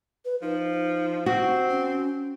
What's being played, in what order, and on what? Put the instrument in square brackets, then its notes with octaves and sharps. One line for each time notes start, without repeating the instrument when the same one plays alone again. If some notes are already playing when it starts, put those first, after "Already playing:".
[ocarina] B4
[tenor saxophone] F3 [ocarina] D#4
[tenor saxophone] C4 [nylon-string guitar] F#4
[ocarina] C#4